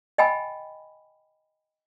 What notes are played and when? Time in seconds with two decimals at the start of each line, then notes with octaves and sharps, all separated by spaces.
0.18 D#5 G5 G#5 B5